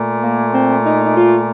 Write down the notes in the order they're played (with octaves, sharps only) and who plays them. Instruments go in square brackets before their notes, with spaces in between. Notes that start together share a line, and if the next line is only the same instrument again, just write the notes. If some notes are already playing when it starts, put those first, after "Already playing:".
Already playing: [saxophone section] A#2 A3
A#3
C4
D#4
D#4
F4